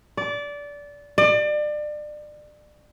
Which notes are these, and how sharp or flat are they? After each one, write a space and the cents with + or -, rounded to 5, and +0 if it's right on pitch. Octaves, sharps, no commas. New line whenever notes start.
D5 -20
D5 +30